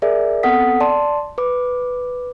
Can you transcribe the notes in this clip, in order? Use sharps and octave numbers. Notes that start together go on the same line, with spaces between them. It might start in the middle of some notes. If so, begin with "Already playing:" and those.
G#4 A#4 D5 E5
B3 C4 A4 F#5 D#6 B6
D5 A5 C6
B4 D6